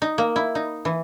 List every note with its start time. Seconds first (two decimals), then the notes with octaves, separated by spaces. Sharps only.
0.02 D#4
0.18 A#3
0.36 E4
0.55 D#4
0.85 E3